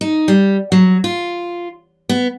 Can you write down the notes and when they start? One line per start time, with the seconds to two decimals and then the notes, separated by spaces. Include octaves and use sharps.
0.01 D#4
0.28 G3
0.72 F#3
1.04 F4
2.09 B3